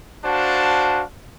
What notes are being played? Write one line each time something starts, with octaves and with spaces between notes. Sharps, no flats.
D4 F#4 C5 F5 A5